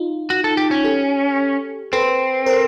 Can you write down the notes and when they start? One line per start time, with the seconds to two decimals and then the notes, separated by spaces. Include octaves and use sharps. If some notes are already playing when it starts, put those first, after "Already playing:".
Already playing: D#4 F4
0.30 F#4
0.44 A4
0.57 G4
0.71 C#4
0.84 G4 A4
1.93 C4 A4 B4
2.46 A#4 C5